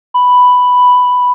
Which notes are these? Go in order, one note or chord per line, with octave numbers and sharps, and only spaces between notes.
B5